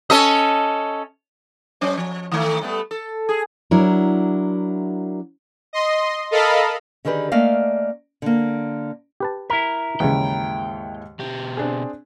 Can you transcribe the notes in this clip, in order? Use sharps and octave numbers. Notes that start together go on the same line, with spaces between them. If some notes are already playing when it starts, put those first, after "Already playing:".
C#4 A4 D#5
F#3 C#4 C5
F3
D#3 A3
G3 A3 B3
A4
G#4
F#3 D4 E4 A#4
D#5 C6
A4 A#4 D#5 F5 A5 B5
D3 D#3 G4 G#4 B4
A3 A#3 C#4 D5 D#5 F5
D3 A#3
G4 B4 A5
E4 A#4 B6
D#2 G#2 C#3 E3 C#5 G5
B2 G4
C4 D4 G#4